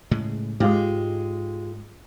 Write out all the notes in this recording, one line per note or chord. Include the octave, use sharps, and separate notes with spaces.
A2 C#3 G#3
G#2 G#3 F4 G4